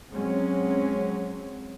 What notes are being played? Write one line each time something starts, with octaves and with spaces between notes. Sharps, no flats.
F#3 G#3 C4 C#4